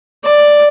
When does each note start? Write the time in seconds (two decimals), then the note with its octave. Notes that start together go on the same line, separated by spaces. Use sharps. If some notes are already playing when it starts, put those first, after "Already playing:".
0.24 D5